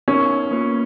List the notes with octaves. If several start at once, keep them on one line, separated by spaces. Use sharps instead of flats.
B3 C#4 D#4 A#4
A#3 F4 B4